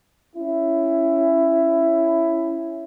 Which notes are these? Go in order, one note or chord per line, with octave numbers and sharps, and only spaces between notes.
C#4 E4